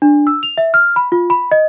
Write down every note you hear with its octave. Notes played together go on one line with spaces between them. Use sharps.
D4
E6
F7
E5
F6
B5
F4
B5
D#5